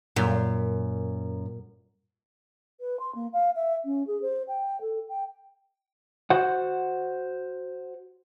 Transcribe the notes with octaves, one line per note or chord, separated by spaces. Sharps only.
F#2 A#2
B4
C6
A#3
F5
E5
C#4
G#4
C5
G5
A4
G5
F#4 C5 F#5